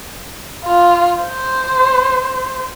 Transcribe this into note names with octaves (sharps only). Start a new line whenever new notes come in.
F4
C5